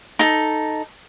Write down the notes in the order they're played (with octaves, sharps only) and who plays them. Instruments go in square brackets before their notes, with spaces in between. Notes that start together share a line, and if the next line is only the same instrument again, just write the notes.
[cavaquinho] D#4 A4